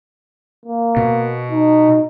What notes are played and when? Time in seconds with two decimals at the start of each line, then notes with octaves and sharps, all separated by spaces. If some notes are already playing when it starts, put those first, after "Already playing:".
0.66 A#3
0.97 B2
1.52 D#4